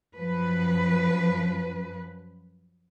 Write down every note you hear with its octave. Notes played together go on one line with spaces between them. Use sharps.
F#2 F3 B4